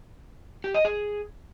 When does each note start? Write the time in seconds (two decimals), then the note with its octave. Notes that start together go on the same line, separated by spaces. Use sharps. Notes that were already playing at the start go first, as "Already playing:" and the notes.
0.64 G4
0.74 D#5
0.85 G#4